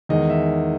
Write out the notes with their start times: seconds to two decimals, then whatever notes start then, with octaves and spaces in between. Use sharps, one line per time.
0.09 E2 D#3 G#3 D#5
0.30 E5